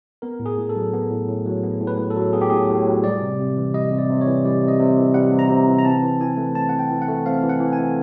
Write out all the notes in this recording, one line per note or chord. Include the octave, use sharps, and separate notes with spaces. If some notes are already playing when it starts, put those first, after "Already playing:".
B3 A#4
A2
G#4
A2
A4
F#3
B3
A2
A2
F#3
B3
A2
B4
A2
A4
F#3
B3 G#4
G4
A2 G#4
A2
F#3
G3 D5
C3
C3
E3
G3 D#5
C3
D5
C3
C#5
E3
G3 D5
C3
D#5
C3
E3
G3 F#5
C3
A#5
C3
E3
A#5
C4 A5
E3
E3 G#5
A3
C4 A5
E3 F#5
G5
E3
F#5
A3
C4 F5
E3
F#5
E3
G#5
A3